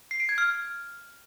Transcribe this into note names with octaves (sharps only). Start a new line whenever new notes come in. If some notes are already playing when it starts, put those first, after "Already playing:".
C7
D7
G#6
F6